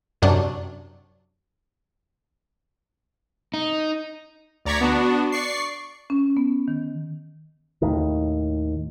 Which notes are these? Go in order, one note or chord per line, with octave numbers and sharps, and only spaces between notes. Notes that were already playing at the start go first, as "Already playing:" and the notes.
F#2 C3 F#3 D4
D#4
D2 D5 A#5 C#6 G#6 B6
B3 D4 F#4
D5 C#6 C7
C#4
B3
D#3
D#2 A2 D#3